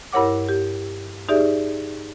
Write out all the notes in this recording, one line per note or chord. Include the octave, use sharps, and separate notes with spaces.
G2 E4 A#4 C#5 F#5 D6
G4
D#4 G4 G#4 D5 E5